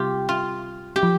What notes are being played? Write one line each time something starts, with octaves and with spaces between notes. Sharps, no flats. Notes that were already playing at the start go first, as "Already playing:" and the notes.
Already playing: C3 G3 C4 F4 G4
F4
G4
F3